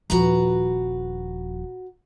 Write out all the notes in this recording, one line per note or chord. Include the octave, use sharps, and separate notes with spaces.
D#1 F3 F#4 B4 A#5